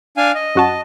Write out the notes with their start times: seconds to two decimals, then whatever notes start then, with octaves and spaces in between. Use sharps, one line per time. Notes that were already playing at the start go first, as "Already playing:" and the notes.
0.17 D4 F5 G#5
0.35 D#5
0.55 F#2 F#4 A5